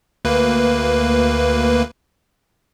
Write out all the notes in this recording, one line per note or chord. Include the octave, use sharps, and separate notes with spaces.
D2 A#3 B4